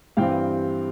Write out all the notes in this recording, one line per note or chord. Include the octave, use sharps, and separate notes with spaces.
G2 E3 G3 C4 F5 G5